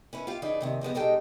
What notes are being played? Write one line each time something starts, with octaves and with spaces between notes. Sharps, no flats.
C#4 E4 B4
F4 G4 F5
C#3 E3 D#4 G#4 D5
D#2 C3 D#3
F3 G3 G#3 B3
B2 G3 G#3 D#4 A4 G5